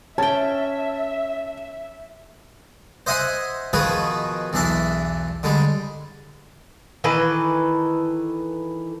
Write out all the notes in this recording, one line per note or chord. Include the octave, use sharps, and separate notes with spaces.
C#4 E5 G5 A5
C5 D#5 E5 F#5 G#5 C6
B2 D#3 F3 F#4 G#4 B4
B1 E2 E3 D4 E5
D3 G3 G#3
D#3 E3 A4 B4